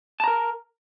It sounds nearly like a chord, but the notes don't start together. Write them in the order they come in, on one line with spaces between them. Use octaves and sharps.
A5 A#5 A#4